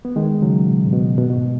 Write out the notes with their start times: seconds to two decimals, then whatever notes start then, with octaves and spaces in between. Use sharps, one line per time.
0.05 B3
0.16 D#3 G#3
0.42 C#3 F#3
0.67 B2
0.86 G#2
0.93 B2
1.18 B2
1.30 B2
1.35 G#2